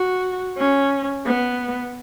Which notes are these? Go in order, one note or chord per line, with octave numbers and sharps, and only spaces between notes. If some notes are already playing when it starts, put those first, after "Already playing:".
Already playing: F#4
C#4
B3